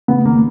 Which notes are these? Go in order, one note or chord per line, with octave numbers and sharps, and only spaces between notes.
C#3 B3
G#1 A#3